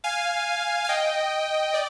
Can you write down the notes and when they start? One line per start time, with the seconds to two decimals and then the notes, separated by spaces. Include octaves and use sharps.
0.04 F5 G#5
0.84 G#5
0.89 D#5 G5
1.74 D5